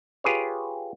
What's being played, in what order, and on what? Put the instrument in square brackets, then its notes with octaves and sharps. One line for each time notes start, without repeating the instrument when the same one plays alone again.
[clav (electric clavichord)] F4 G4 G#4 B4 C#5